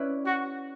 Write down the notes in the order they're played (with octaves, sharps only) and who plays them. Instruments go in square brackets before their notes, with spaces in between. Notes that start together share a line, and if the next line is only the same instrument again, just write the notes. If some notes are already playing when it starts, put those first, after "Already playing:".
Already playing: [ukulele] C#4 E4 B4 D5
[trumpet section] F#4